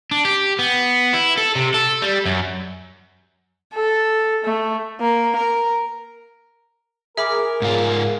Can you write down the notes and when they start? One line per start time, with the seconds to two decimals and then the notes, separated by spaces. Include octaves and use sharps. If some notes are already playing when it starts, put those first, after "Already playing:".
0.11 D4
0.25 G4
0.59 B3
1.14 E4
1.38 A4
1.55 C3
1.74 A4
2.02 G3
2.25 F#2
3.74 A4
4.44 A3
5.01 A#3
5.36 A#4
7.17 G#4 A#4 E5 B5 D6
7.62 G#2 F4